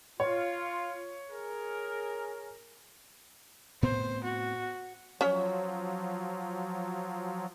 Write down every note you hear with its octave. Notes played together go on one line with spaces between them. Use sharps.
F4 C#5
G#4 A#4
A2 B3 C4 C5
F#4
F3 F#3 C#4 C#5